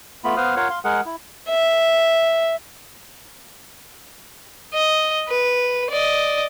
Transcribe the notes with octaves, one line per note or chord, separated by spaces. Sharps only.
A3 B3 F4 B5
B3 B4 C5 F5 D#6 F6
F4 A#4 C#5 F5 F#5
F5 C6
G#3 G#4 A#4 F#5
E4
E5
D#5
B4
D5 D#5